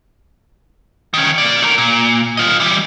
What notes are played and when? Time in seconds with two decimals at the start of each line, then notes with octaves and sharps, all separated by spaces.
1.14 D#3 C#4
1.38 A#3 D5
1.62 A3 A#4
1.78 A#2
2.37 F4 D#5
2.60 E3 G3